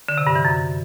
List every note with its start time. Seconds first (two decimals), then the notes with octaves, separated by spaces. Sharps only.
0.09 D3
0.18 C3
0.27 G2
0.36 E3
0.45 F#2